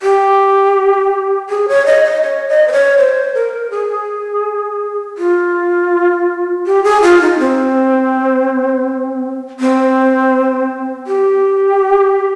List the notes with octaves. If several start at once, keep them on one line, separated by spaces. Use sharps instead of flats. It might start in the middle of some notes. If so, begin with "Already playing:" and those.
G4
G#4
C#5
D#5
D#5
C#5
D#5
C5
C#5
C5
A#4
G#4
F4
G4
G#4
F4
D#4
C4
C4
G4